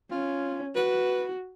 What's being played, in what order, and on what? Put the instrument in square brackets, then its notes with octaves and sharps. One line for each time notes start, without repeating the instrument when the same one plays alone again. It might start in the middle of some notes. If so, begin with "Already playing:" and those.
[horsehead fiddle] C#4 [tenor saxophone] F4
[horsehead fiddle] F#4 [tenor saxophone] B4